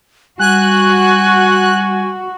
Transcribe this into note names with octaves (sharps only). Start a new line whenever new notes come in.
G3 F#4 G#5 F#6